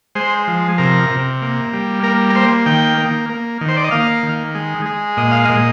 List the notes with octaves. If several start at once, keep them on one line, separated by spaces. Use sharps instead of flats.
G#3 C5
F3
C3 A#4
C3
A#3
G3
A#3 A#4
A#4
A#3 C5
D#3 G5
A#3
A#3
D#3
C5
D5
D#5
A#3 F5
D#3
G#3
G#3
A#2 D#5
F5
A#2 D#5